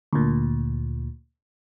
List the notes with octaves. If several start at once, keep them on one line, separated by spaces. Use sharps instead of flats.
D2 A#2